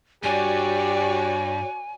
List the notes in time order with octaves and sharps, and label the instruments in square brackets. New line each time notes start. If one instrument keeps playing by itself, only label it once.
[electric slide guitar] G2 D4 [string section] F#4 C#5 D5 [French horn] G4 [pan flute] G#5